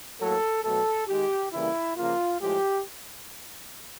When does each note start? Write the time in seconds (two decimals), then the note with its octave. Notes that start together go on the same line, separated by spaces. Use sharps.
0.20 A2 F#3 A#3 A4
0.64 B2 F#3 A3 A4
1.08 D#3 G#3 G4
1.53 C#3 E3 G3 A#3 E4
1.96 C#3 F3 A#3 F4
2.41 A2 F3 G#3 G4